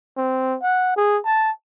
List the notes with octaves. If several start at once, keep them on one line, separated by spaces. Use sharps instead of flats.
C4
F#5
G#4
A5